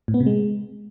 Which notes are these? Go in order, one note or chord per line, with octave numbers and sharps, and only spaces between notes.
A2
B3
C3
G#3